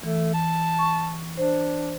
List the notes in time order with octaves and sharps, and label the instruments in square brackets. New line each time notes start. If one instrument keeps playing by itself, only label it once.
[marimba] E3 [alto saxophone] A3
[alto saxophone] A5
[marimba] C#6
[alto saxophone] D4 [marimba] C5